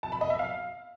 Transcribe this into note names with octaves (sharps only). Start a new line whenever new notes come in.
A5
B5
D#5
E5
F5